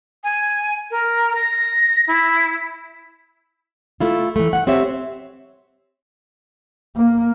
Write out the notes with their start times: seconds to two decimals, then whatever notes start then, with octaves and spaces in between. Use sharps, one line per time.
0.23 G#5
0.90 A#4
1.35 A#6
2.07 E4
4.00 A3 E4 F4
4.36 E3 A3
4.53 F#5
4.67 C4 G4 C#5 E5
6.96 A#3